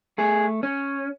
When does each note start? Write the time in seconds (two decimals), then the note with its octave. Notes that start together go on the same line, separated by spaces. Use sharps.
0.18 A3 G#4
0.63 C#4